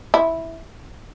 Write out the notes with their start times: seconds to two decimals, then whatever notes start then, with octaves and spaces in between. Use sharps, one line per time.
0.14 E4